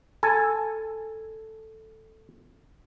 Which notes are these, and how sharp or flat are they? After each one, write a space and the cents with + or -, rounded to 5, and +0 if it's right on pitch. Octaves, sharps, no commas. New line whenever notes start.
A4 +0 G#5 -5